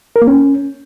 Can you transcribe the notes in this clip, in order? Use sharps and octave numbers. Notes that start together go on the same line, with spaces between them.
A#4
A#3
C#4